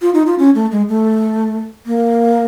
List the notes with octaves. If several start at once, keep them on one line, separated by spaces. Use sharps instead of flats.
F4
D#4
F4
C#4
A3
G#3
A3
A#3